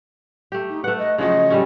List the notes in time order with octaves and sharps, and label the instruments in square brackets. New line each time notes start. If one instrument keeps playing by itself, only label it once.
[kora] A3 G4
[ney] D#4
[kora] A3 F#5 [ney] B4
[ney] D#5
[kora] C#3 F3 F#3 [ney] D#5
[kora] G3 A3 C#4